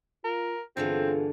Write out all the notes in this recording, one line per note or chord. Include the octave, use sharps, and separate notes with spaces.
F4 A#4
G2 D3 E3 B3 C4 F4 G#4